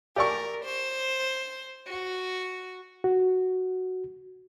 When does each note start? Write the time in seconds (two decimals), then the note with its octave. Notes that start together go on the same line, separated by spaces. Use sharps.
0.16 G4 A#4 D5 C#6
0.65 C5
1.87 F#4
3.04 F#4